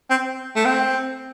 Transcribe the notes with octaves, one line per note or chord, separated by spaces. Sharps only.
C4
A3
C4